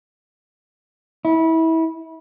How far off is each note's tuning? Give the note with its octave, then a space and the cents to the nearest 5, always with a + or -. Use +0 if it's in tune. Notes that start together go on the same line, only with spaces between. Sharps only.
E4 -25